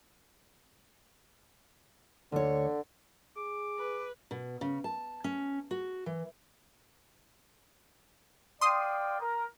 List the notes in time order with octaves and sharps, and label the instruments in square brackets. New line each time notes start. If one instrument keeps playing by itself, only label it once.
[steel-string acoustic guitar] D2 C#5 [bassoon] D3
[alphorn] G#4 [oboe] D6
[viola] B4
[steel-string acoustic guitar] B2
C#3
A5
C#4
F#4
E3
[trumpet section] D5 F5 G5 [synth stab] C6 D#6
[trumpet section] A#4